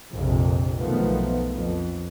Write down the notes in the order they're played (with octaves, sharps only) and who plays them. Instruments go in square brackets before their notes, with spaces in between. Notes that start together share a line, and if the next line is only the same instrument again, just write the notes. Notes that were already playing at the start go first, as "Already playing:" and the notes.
[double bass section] A#1 F2 C3
B1 B2 D#3 F3 A3 B3
F2